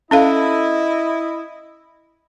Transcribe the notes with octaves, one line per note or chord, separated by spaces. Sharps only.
C#4 E4 A4 D#5 F5